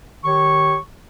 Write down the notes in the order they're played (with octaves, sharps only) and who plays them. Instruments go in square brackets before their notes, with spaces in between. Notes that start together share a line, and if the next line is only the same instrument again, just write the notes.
[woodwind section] D#3 G4 C#5 C#6